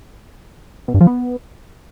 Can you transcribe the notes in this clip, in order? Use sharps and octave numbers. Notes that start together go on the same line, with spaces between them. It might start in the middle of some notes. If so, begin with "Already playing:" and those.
B2
G2
F3
B3